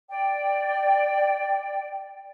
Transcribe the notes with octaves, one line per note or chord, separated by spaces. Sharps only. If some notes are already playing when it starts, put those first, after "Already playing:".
D5 G5